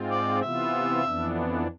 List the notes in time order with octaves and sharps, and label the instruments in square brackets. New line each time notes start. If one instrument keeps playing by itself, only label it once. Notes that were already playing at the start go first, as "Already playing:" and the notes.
Already playing: [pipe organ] G#2 G#3 C4 F4
[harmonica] D5
[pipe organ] C3 E3 B3 F4 [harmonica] E5
[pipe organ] F2 E3 B3 D4